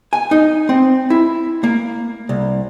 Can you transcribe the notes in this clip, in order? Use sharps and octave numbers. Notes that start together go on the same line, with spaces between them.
G#5
D#4
C4
E4
A#3
C2